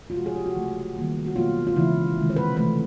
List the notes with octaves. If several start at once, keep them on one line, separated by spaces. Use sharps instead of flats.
F4
C3 F3 G#3 F#4
G#4
G4
F#4
C#3 F#3 A3
D#3 G3 A#3
F#4
B2 F#3 A#3 F4
F4
C#3 E3 G#3 E4
C3 D#3 G#3
C5
B4
C3 E3 A3 B4